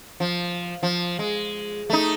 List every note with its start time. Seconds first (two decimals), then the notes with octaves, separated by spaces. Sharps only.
0.20 F3
0.83 F3
1.19 G#3
1.90 A3 D#4